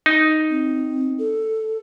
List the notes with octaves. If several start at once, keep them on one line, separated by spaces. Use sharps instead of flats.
D#4
C4
A4